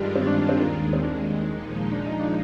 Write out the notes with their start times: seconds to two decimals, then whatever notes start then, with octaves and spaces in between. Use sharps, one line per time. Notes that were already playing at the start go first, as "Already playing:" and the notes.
Already playing: G2 D#3 G3 G#3 D4 F4
0.16 C4
0.27 D4
0.38 D4
0.49 C4
0.60 D#2 D#3 G#3 A#3
0.93 C4
1.03 D4
1.47 A#2 F3 G#3 D#4
1.92 D4
2.06 D#4
2.20 D4